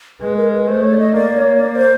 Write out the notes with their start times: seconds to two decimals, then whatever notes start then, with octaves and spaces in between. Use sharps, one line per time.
0.20 G#3 B4
0.36 A#4
0.51 B4
0.67 A3 C5
0.82 C#5
0.93 D5
0.98 D#5
1.14 A#3 D5
1.37 C#5
1.60 D5
1.75 C5